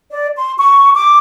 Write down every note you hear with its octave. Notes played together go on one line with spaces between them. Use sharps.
D5
C6
C#6
D6